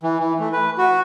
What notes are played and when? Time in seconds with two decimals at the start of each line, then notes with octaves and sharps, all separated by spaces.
0.03 E3
0.20 E3
0.39 A3
0.53 B4
0.78 F#4